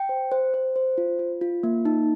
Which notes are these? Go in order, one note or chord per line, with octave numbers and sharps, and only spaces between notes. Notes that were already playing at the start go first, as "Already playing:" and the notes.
Already playing: G5
C5
C5
C5
C5
F4
F4
F4
A#3
D#4